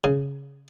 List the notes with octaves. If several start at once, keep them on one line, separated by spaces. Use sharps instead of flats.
C#3